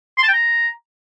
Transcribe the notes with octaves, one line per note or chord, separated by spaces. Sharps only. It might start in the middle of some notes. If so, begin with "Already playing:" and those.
C6
A5
G5
A#5